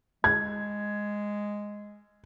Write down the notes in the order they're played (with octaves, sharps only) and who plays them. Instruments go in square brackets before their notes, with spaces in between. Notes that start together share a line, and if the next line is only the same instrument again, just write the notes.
[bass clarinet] G#3 [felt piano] G#6